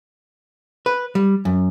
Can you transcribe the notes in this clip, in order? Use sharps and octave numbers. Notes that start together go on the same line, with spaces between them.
B4
G3
F#2